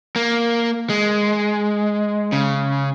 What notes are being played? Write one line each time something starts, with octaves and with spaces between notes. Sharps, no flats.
A#3
G#3
C#3